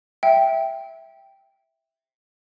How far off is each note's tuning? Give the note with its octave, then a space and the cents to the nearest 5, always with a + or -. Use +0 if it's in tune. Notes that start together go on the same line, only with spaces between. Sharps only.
E5 +0 G5 +0